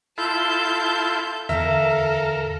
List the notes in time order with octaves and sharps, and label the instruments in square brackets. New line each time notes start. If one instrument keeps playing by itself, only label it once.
[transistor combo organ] E4 F4 A4 [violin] A5 G6
[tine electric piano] E2 D3 F5 [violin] A4 [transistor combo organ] A#4 [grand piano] E5